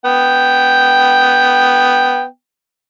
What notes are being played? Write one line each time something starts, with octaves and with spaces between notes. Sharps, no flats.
B3 G5